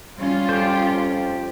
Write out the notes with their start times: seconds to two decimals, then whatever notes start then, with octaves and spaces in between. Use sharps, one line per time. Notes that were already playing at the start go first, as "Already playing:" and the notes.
0.18 G3 C#4 F4
0.49 F2 G4 C5